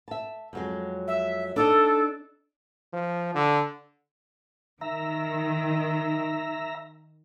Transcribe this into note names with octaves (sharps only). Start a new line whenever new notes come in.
E5 A5
F2 F#3 G#3
E5
D4 D#4 A4 D#5
F3
D3
D#3 E5 A#5